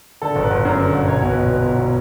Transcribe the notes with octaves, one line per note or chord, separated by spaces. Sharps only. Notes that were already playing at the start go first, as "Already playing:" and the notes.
D3 A4
G1
B4
G1
F#2
D3
G1
B1 C#5
B2 C#5
B4
B1
B2 B4
B1
B2